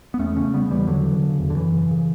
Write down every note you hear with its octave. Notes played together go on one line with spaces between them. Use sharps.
B3
E2 A3 C#4
C#3 A3 C#4
C#3 G3 B3
E2 E3 G3
E2 D3 F#3
C#3
C#3
E2
D3
F#2 E3
C#3
C#3